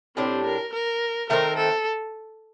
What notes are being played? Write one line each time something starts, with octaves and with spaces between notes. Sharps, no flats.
A2 G3 C4 D4 G4
A#4
A#4
D#3 A3 C4 A#4
A4